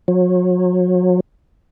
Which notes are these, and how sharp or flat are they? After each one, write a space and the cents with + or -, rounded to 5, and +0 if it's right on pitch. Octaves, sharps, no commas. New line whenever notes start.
F#3 -35